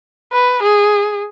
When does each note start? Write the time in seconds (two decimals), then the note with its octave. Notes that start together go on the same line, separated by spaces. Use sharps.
0.32 B4
0.63 G#4